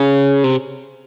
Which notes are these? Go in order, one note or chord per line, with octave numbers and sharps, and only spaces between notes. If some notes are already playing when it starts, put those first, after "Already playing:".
Already playing: C#3
C3